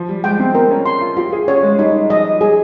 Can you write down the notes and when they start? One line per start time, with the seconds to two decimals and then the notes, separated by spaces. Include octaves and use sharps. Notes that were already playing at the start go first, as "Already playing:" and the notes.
Already playing: F3
0.09 G3
0.24 G#3 G5
0.40 C4
0.55 C4 A#4
0.70 C#4
0.86 C6
1.01 F4
1.16 F4 G4
1.33 G#4
1.48 C#4 C#5
1.63 G#3
1.78 G3 D#4
2.10 F3 D#5
2.41 G3 G#4